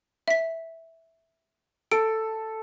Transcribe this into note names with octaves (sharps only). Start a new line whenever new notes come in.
E5 B6
A4 D7